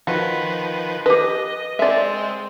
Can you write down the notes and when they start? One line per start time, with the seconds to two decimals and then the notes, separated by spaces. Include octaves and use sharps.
0.07 D#3 F3 F#4 B4
1.06 G4 B4 D#5
1.79 G#3 C4 D5 E5